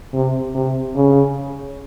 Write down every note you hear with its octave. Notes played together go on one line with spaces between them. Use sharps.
C3
C3
C#3